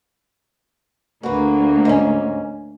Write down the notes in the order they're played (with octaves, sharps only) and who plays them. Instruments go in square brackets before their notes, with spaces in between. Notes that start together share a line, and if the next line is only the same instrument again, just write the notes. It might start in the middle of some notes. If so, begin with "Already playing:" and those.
[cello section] D2 A#3 [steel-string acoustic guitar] F#4 B4
[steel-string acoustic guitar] G#2 C#4